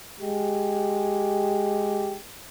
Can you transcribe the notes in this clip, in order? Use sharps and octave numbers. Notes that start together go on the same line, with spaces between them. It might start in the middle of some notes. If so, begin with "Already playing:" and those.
G#3 G4